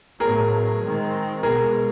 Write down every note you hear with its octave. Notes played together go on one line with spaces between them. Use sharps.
A2 F#3 B3 G#4 A#4
D#3 G#3 C4
B2 G#3 B3 G#4 A#4